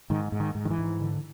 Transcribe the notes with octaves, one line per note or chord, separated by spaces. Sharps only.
G#2 D#3
G#2
D#3
G#2
D#3
E3
G#2
D3